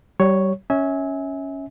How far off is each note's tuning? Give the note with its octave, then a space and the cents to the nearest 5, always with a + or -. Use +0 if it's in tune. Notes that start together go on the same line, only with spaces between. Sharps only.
G3 -25 C#5 +0
C#4 +0 E5 -30 G#5 +0